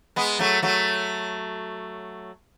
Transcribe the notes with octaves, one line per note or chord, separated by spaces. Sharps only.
G#3 B3
F#3 A3
F#3 A3